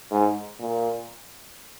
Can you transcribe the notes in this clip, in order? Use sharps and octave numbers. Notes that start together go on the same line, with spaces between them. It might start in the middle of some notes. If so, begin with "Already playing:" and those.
G#2
A#2